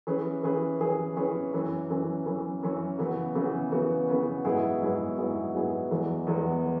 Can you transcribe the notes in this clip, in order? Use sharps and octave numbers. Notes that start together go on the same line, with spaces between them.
E3 C#4 G#4 B4
E3 C#4 G#4 B4
E3 C#4 G#4 B4
E3 C#4 G#4 B4
F#2 E3 C#4
F#2 E3 C#4
F#2 E3 C#4
F#2 E3 C#4
C#3 E3 B3 F#4 B4
C#3 E3 B3 F#4 B4
C#3 E3 B3 F#4 B4
C#3 E3 B3 F#4 B4
G#2 F#3 B3 E4 G#4
G#2 F#3 B3 E4 G#4
G#2 F#3 B3 E4 G#4
G#2 F#3 B3 E4 G#4
E2 E3 G#3 B3
E2 E3 G#3 B3
E3